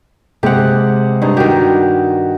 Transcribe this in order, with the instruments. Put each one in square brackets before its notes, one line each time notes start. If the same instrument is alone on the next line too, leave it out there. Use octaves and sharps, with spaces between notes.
[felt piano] C3 G#3 [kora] G4 F#5
[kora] G2 D#4
[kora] D#3 G4 [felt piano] F#4